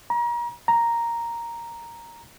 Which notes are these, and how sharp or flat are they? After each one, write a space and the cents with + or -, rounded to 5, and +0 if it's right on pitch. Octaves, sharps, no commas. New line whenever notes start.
A#5 +35
A#5 +0